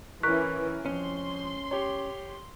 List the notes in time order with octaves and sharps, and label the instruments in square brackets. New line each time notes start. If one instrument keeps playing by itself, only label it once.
[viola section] E3 [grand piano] C#4 A#4 [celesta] C#6 F#6 B6
[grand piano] F2 [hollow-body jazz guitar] C#4 [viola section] C6
[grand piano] G4 C#5